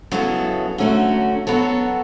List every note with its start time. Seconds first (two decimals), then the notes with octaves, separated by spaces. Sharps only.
0.12 C#3 F#3 B3 E4 A4
0.78 D3 F#3 A3 C#4 F#4
1.47 F#3 B3 F#4 A4 C#5